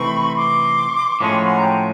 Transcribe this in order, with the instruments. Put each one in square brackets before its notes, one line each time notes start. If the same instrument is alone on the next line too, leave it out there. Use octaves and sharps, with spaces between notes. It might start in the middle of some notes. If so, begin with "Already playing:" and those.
Already playing: [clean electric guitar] C3 E3 A3 C4 D#4 [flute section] B5 C#6
[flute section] C6 D6
[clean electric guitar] A2 F3 G#3 C#4 [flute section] B5 C#6
[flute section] G5
F#5 G#5
A#5
G5 A5